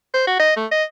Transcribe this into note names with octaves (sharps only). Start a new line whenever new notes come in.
C5
F#4
D#5
A3
D#5